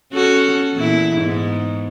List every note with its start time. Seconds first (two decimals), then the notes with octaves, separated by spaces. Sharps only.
0.13 C#4 F#4 A4
0.74 E2 A#2 E4
1.17 G#2 B3